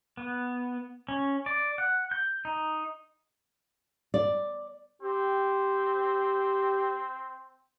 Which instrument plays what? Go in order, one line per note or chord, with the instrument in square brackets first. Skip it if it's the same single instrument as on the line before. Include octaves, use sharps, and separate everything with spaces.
[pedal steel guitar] B3
C#4
D5
F#5
G6
D#4
[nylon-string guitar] D5
[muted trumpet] C4 [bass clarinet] G4